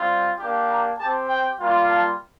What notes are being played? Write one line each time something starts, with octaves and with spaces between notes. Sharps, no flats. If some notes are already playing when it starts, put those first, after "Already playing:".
Already playing: G3 C4 F4
A#3 D4 G4
A#5
C4 G4 A5
G5
G3 A#3 F4
A5